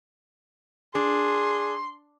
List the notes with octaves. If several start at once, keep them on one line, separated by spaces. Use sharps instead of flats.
D4 G#4 C6